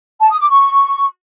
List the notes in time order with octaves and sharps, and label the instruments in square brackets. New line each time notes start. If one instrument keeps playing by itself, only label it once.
[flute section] A5
D#6
D6
C#6